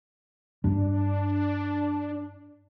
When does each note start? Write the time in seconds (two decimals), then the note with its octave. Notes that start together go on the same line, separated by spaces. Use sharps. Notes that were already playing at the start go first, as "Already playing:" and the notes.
0.64 G2 G3 D4